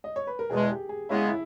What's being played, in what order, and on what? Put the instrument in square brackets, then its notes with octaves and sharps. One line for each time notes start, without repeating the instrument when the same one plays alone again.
[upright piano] D#5
C#5
B4
A#4
[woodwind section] E2 B2 G#3 [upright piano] G#4
[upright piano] G4
G#4
[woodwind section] C#3 G#3 B3 [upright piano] E4
[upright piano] E4